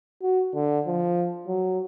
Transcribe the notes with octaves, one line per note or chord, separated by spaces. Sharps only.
F#4
D3
F3
F#3